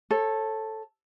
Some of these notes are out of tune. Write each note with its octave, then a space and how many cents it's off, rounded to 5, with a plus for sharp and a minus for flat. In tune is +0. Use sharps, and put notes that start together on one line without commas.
A4 +0 C#5 -30